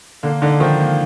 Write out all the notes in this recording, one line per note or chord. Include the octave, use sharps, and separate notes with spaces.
D3 A#3
D3 D#4
D#3 F3
A#3